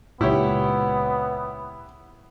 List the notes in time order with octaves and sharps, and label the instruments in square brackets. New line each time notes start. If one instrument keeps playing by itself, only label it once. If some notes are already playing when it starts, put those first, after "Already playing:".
[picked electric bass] C#2 A#2 [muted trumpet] B3 [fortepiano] E4 G4 C#5